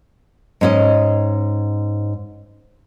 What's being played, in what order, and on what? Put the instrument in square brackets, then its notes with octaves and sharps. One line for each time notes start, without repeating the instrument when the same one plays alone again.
[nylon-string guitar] G#2 C#4 D#5